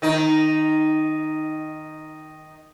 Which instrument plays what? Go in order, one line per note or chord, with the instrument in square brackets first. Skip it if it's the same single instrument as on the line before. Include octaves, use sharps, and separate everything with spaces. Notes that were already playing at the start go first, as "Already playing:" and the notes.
[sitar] D#3 D#4